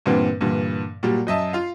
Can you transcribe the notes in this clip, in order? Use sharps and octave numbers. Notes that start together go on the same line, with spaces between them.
G2 A#2 D3 E3 B3 C4
G2 A#2 D3 E3
A#2 F#3 G3
F#2 D#5 E5 A5
F4 F5